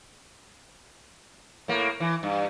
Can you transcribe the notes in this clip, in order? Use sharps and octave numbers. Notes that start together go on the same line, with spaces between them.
A2 A#3
E3
G2